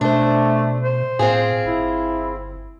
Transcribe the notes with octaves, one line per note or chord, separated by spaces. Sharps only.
B2 A3 D4 C5
C5
A2 C4 F4 G#4
G1 E4